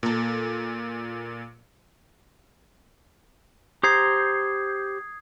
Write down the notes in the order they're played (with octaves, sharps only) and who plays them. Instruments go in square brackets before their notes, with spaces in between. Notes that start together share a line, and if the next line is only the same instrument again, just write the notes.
[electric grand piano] A#2 [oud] A#3 A4
[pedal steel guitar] G4 C5 A#5 [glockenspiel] D#6 G#6 C7